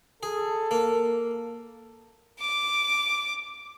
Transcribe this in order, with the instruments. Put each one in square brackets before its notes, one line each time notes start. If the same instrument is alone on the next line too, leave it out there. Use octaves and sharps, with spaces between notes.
[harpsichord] G#4 [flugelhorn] A4
[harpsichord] A#3
[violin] D6